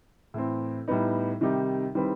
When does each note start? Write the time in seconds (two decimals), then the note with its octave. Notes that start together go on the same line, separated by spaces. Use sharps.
0.34 A2 E3 A3 C4 E4
0.88 A2 G3 B3 D#4
1.41 C3 D#3 G3 D#4 G4
1.95 D#3 G3 C4 E4 B4